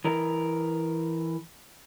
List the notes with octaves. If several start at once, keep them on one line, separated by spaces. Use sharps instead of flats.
E3 A#4